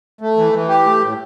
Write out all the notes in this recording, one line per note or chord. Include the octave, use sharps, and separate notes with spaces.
A3
E3
E3
G4
A3
A2